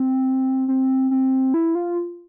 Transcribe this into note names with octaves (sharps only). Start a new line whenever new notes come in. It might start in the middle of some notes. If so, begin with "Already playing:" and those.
Already playing: C4
C4
C4
E4
F4